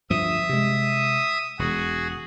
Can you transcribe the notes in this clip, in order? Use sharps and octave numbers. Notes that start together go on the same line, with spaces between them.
D2 G2 F3 E5 D#6
C3 G#3
E1 F#4 G#4